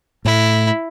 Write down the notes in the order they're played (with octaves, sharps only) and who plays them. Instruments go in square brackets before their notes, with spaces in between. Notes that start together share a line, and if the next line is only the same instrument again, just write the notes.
[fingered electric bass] A2 A3 [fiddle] E4